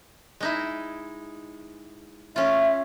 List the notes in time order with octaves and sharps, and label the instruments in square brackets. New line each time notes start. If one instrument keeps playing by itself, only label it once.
[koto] G#3 D#4 E4
[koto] C#4 F4 [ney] E5